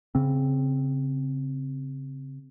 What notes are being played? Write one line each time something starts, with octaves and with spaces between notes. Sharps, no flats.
C#3 C4